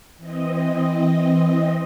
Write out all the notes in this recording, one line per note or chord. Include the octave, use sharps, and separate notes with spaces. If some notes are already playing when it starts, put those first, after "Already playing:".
E3 C4 D#5